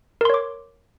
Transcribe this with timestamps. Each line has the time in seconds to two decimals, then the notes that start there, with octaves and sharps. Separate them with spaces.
0.21 A#4
0.25 C6
0.30 C#5
0.34 D6